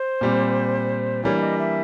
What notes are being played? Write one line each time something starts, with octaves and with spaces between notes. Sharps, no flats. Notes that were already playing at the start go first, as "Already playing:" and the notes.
Already playing: C5
A#2 G3 C4
E3 G3 A#3 D4 C#5
E5
D#5
E5